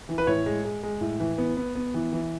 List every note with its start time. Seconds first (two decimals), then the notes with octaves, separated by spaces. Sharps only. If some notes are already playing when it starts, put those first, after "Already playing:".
0.09 E3
0.18 B4
0.27 A2 C#5
0.46 G#3
0.65 G#3
0.83 G#3
1.01 A2
1.20 E3
1.38 B3
1.57 B3
1.75 B3
1.94 E3
2.13 E3